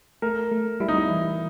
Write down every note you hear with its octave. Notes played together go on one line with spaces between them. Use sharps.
A3 A#4
A3
G3 E4
D#4
E4
E3